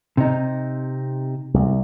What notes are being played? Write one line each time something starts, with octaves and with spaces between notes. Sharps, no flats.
C3 D#4
C2